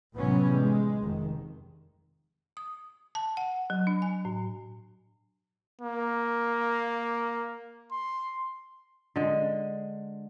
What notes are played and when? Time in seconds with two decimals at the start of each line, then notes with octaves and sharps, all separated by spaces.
0.14 A1 C3 E3 F#3 B3 C#4
0.49 G#3
1.01 F1 D#3
2.57 D#6
3.15 A5
3.37 F#5
3.70 F#3
3.87 D4
4.02 G#5
4.25 A2
5.81 A#3
7.92 C6
9.16 D3 G#3